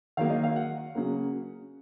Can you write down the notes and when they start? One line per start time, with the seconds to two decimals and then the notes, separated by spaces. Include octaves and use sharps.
0.17 D#3 F#3 A#3 F5
0.30 D#5
0.43 F5
0.56 F#5
0.95 C#3 F#3 A#3